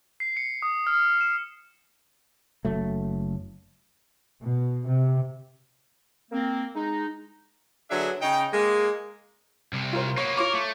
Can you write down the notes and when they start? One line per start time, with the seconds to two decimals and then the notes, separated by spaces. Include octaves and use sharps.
0.20 C7
0.37 C#7
0.62 D#6
0.87 F6
1.21 E7
2.65 F#1 F#3 A3
4.43 B2
4.87 C3
6.31 A#3 C4
6.74 G#3 D#4
7.91 D3 F#3 B3 D4 G#4 E5
8.22 C#3 D#4 G5
8.52 G#3 A#3
9.73 C2 C3
9.93 F4 A#4 C5
10.17 A#3 B3 C#5
10.37 F4 A#4 C#5 D6
10.54 A3